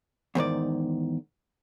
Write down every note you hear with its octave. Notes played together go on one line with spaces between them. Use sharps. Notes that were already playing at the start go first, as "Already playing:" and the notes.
E2 G#2 D#3 D5